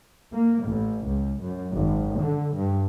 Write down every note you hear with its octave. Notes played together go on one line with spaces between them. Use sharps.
A#3
A1
C#2
F#2
G#1
D3
G2